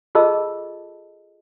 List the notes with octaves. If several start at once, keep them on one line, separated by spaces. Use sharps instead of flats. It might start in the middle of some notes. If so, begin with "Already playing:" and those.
F4 G#4 A4 D#5 A5 E6